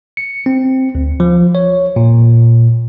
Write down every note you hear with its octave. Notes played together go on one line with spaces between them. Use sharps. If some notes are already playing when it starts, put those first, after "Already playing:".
C#7
C4
D2
F3
C#5
A#2